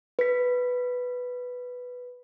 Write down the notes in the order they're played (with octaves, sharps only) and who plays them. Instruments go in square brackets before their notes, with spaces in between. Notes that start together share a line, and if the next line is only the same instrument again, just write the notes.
[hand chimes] B4 B6